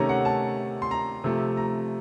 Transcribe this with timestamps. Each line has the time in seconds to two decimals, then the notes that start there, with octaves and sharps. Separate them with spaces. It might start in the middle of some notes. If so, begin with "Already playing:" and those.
Already playing: C3 D#3 A3 C#4 A#5
0.09 F#5
0.25 A5
0.82 C6
0.91 A#5
1.24 C3 F3 A3
1.57 A#5